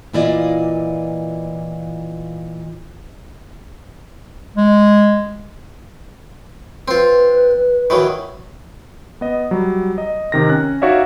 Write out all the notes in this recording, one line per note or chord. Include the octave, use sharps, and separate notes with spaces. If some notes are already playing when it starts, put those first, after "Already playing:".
A#2 E3 E4 F4 D5 D#5
G#3
C4 F4 B4
D#3 E3 F#3
B3 D#5
F#3 G3
D#5
C3 D#3 A#6
C#4 F#6
D#4 F#4 C#5 D5 E5 F5